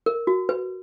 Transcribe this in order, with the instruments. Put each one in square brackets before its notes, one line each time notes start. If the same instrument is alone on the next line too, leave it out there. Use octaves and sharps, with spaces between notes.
[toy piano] A#4
F#4
B4